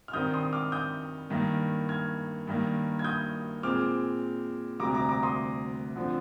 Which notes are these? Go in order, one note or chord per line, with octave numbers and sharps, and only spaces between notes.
F6
G2 D#3 G3 C4 D#6 G6
C6 D#6
D6 F6
D#6 G6
G2 D#3 A#3
F6 G#6
G2 D#3 A#3
G#6
D#6 G6
A#2 G#3 C4 D6 F6
D2 C3 G3 A#5 D6
A#5 D6
A#5 D6
C6 D#6
D3 F3 C4